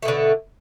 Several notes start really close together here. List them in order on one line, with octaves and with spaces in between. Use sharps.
A3 B2 D3